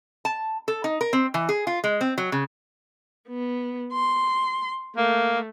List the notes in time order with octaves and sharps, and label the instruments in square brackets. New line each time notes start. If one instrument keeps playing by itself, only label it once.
[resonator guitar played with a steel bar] A5
A4
D#4
A#4
C4
E3
G#4
F4
G#3
C4
F#3
C#3
[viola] B3
C6
[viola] A3 [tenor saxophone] A#3